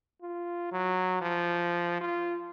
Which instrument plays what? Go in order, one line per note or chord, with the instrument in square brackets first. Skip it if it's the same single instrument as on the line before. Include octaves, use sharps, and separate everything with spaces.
[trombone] F4
F#3
F3
F4